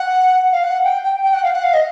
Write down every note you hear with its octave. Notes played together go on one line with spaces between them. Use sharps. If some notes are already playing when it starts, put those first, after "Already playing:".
Already playing: F#5
F5
F#5
G5
G5
G5
F#5
F5
F#5
F5
D#5